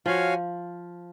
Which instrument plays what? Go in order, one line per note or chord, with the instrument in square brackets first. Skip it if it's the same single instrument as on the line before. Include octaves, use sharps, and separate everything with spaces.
[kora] F3 [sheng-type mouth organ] F#4 C#5 F5 G#5